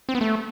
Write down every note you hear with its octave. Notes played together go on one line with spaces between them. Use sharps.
C4
B3
A3